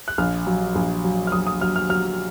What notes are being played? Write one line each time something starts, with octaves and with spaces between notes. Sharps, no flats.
F#6
A#1 F6
F#3
A#1
F#3
F6
F#3 D#6
D#6
F#3 F6
F6
F#3 F6